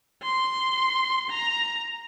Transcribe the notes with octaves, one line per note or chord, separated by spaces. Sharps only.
C6
A#5